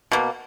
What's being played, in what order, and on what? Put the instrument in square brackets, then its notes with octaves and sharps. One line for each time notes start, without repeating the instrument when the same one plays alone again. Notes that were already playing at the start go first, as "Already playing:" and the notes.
[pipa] B2 A#3